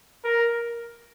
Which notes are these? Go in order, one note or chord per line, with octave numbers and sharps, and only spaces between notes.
A#4